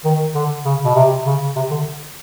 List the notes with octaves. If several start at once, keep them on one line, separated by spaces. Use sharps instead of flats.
D#3
D3
C#3
B2
C3
C#3
C3
D3